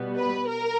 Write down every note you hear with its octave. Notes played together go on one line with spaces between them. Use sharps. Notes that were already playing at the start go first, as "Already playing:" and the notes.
Already playing: B2 G3 B3
B4
A#4